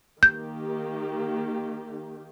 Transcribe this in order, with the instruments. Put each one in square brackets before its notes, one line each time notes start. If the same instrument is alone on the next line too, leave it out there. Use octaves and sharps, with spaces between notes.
[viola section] D#3 A#3 G4 [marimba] G6